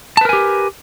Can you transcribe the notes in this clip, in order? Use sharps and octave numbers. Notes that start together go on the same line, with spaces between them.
G4 A#4 B4 G#5 A5